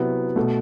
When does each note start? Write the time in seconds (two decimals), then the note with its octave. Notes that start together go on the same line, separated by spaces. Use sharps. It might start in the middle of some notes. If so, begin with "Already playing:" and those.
Already playing: C3 F#3 B3 E4
0.36 B2 A3